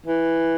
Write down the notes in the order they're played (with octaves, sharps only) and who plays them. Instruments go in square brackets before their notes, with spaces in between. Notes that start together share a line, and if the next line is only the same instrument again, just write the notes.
[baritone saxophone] E3